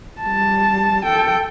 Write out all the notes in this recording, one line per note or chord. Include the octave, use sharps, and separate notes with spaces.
G3 A5
A4 G5